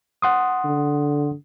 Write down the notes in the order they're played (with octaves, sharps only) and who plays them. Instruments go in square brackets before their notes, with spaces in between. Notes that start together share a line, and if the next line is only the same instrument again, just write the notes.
[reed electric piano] F#5 C6 D#6
[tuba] D3